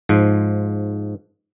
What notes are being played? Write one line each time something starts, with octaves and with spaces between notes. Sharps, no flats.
G#2 F3